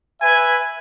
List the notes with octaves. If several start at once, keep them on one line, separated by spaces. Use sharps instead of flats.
B4 E5 G#5